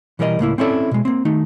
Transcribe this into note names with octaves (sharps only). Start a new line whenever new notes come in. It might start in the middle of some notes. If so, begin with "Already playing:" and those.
B2 E3 G3 A#4 C#5 D#5
C#2 A2 A#3 E4
C4 C#4 E4 A4 D5
B2 G#3
A#3 C4
D#3 A3 D#4